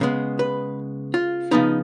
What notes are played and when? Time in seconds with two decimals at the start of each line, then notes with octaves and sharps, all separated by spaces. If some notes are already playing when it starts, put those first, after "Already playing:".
0.01 C#3 G#3 B3
0.39 B4
1.14 F4
1.51 C#3 F3 B3 D#4